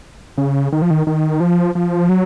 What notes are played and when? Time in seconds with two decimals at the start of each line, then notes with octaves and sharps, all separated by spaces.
0.38 C#3
0.72 D#3
0.82 F3
0.90 D#3
1.07 D#3
1.40 F3
1.75 F3
2.09 F#3